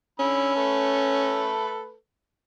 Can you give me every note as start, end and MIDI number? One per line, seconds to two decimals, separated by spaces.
0.20 0.55 50
0.20 1.55 61
0.20 0.55 83
0.20 0.55 88
0.55 1.95 57
0.55 1.95 69
0.55 1.95 71